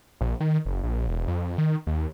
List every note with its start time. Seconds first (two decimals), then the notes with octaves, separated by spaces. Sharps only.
0.21 A#1
0.40 D#3
0.66 F#1
0.83 A#1
1.08 E1
1.28 F2
1.58 D#3
1.87 D#2